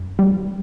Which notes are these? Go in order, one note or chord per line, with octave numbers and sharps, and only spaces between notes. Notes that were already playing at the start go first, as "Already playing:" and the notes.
Already playing: F#2
G3